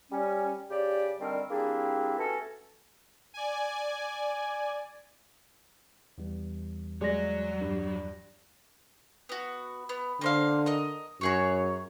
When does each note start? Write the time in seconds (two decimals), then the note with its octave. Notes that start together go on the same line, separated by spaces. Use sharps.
0.10 G3 C#4
0.71 C#3 G4 D5
1.19 D3 D#3 G3 C4 A#4 D5
1.50 G3 A#3 C4 D4 E4 G#4
2.18 A3 B3 C#4 F#4 A4
3.34 D5 G#5
6.18 E2 E3 G3
7.01 F#3 G#3 D5 A#6
7.61 G2
9.29 B3 F#4
9.89 B3
10.21 D3 A#3 C5 F5
10.66 A#4 D#5
11.21 F#2 F#4 G#4 C#5